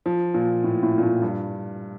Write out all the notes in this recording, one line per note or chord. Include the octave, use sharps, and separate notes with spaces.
F3
A#2
A2
A2
A#2
A2
G2